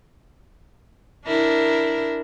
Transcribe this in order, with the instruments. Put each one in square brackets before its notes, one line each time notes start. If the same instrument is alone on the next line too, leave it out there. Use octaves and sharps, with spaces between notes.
[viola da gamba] D4 E4 A#4